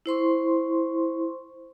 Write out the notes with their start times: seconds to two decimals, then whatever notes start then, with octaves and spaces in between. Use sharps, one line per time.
0.06 E4 C5 C6 C#6